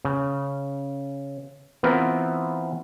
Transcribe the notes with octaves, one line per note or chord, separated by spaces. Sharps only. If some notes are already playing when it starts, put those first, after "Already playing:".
C#3
E3 B3 C4 F4 A#4